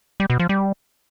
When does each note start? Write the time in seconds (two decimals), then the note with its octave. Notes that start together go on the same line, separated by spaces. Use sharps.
0.20 G3
0.30 B2
0.39 F3
0.49 G3